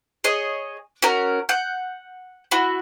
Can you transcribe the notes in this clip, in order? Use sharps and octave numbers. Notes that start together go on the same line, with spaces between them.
G#4 C#5 D#5
C#4 F#4 A#4
F#5 G6
E4 F#4